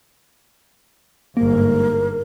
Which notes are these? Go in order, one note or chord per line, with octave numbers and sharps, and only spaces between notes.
G1 G#2 A#3 A#4